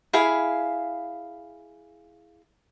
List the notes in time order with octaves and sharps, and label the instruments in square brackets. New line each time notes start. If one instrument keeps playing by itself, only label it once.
[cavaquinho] E4 G#4 F5 B5